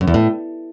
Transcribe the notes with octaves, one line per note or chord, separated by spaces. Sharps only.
F#2
E2
A2